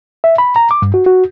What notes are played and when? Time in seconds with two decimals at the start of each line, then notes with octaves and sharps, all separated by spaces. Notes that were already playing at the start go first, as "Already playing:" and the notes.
0.24 E5
0.38 B5
0.56 A#5
0.71 D6
0.82 G2
0.94 F#4
1.06 F#4